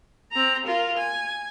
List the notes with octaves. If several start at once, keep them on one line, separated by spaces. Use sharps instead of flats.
C4 A#5
F4 A#4
G#5